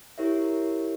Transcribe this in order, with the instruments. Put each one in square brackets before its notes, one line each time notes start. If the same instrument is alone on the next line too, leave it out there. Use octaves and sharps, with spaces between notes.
[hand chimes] E4 G4 A#4 C#5 E5